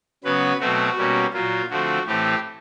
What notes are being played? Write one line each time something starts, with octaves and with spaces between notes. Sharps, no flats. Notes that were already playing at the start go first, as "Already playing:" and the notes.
C#3 F#3 B3 B4
B2 F#3 A3 C4 F#4
B2 G3 A#3 C#4
A#2 F#3 A#3 F4
D3 F3 A3 C4 F#4
A2 E3 A3 C4 G4